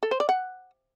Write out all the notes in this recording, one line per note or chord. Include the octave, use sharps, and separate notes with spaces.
A4
C5
D5
F#5